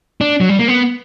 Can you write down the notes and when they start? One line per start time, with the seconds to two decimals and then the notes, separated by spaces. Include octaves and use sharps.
0.21 D4
0.41 F#3
0.49 G3
0.59 A#3
0.68 B3